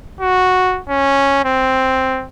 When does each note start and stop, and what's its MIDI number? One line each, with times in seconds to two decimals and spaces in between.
0.21 0.80 66
0.89 1.40 61
1.45 2.25 60